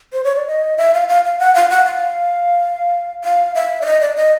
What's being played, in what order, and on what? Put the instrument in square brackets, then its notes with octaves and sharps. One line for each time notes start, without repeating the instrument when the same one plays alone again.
[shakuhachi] C5
C#5
D5
D#5
E5
F5
F5
F5
F#5
F5
F#5
F5
F5
E5
D5
D#5
D5
D#5